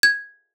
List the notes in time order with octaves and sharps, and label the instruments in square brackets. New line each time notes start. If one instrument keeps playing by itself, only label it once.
[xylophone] G#6